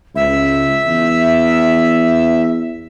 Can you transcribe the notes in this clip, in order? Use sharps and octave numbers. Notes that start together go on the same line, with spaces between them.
C#2 E5
E2